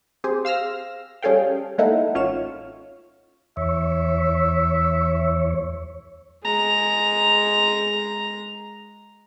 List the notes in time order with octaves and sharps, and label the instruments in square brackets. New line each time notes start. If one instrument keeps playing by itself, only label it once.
[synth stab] C4 G4 G#4 C5
F5 E6 F6 A#6
G3 C#4 G#4 A4 F5 G5
G#3 A#3 D#4 E4 A4 F#5
A1 C#4 F4 C#6 F6 E7
[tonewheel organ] E2 C#5 [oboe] E5
[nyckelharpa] G#3 A#5